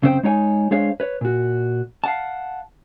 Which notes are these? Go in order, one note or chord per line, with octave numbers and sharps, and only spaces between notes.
F#2 C#3 C4 E4 C5 G5
G#3 D#4 C#5 G5 G#5
G#3 D4 G#4 C5 C#5 F5
B4 C#5
A#2 F#4
F5 F#5 A5